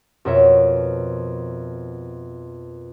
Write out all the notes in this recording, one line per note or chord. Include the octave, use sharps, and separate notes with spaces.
F2 B2 A#4 C#5 E5